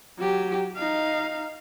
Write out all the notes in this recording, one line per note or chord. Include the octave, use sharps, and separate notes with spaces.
F#3 G4
D#4 F5